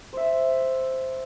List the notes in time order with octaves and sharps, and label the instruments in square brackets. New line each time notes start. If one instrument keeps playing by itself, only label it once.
[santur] C5 E5